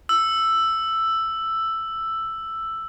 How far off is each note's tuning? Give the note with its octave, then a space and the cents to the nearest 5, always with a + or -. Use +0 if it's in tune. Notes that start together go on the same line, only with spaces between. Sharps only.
E6 +5